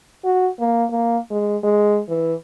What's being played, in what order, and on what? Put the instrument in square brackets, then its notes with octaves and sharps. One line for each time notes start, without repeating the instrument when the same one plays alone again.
[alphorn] F#4
A#3
A#3
G#3
G#3
E3